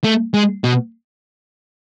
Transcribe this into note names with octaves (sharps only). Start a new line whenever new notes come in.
A3
G#3
B2